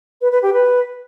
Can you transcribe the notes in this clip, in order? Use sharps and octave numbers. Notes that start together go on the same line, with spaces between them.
B4
B4
G4
B4